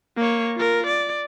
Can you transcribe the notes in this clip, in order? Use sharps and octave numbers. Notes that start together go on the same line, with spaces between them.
A#3 C#5
F4 A#4
D5